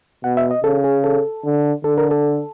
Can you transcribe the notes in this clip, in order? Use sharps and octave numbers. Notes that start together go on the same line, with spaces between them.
B2 F#5
E5
D#5
C#3 A4
G#4
A4
D3
D3 A4
A#4
A4